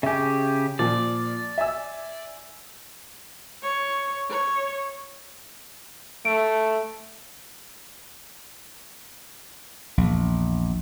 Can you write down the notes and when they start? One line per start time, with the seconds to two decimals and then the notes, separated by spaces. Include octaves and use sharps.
0.03 C#3 G4 E5 G#5
0.79 A#2 F3 D5
1.58 E5 G#5 E6
3.63 C#5
4.30 C#5
6.25 A3 D7
9.98 A#1 E2